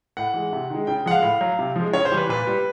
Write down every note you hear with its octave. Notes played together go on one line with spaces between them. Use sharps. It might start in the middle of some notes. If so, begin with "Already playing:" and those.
A2 F#5
E3 G#3
C3
D#3 G#3
C#3 G5
F3 G#3 F#5
F5
A2
F#3
C3
F3 G#3
C#3 C#5
C5
E3 G3
B4
A#2 B4
G3